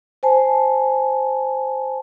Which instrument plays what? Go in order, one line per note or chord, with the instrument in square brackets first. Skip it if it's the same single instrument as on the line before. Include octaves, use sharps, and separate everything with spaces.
[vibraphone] C5 G#5 A5